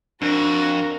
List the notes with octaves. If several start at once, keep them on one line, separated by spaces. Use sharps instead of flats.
F2 D4 F#4 A#4